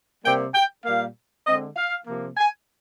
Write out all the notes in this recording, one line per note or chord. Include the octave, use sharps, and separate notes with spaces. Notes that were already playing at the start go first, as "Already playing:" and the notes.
C3 G3 A#3 G5
G5
A#2 G3 A#3 F5
D3 G#3 C4 D#5
F5
C3 F3 A#3
G#5